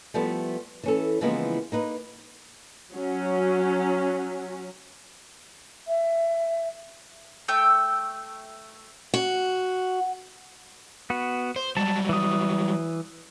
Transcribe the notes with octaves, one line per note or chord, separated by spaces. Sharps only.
F3 G3 A3 B3
E3 C#4 A4
C#3 E3 F3 G#3 A#3 B3
A#3 D#4 B4
F#3 C#4
E5
A3 G5 E6
F#4
B3 F#4
C5
F#3 G3 A5
E3 D#6